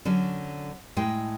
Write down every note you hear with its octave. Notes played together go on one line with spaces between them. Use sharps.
D3 F#3 C#4
A2 G#3 G5